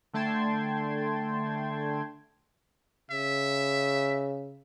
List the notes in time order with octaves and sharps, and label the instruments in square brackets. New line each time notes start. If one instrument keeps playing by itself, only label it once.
[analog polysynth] D3 A3 G5 A5 C6 G#6
[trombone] C#3 [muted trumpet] E5